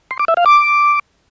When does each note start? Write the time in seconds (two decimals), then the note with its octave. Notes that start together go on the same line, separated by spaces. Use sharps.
0.11 C6
0.20 D6
0.28 E5
0.37 F5
0.46 D6